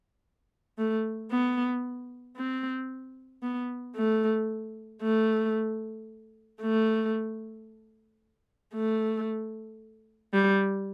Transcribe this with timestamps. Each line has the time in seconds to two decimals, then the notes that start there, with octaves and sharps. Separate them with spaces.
0.78 A3
1.30 B3
2.37 C4
3.43 B3
3.96 A3
5.02 A3
6.62 A3
8.75 A3
10.34 G3